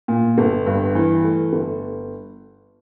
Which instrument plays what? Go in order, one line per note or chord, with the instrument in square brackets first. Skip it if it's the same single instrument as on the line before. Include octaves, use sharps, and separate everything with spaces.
[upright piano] A#2
G1
G2
E3
A3
G1